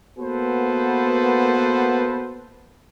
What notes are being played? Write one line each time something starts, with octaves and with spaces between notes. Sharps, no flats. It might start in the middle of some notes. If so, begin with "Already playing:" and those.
A#3 B3 F#4 A4 B4 C5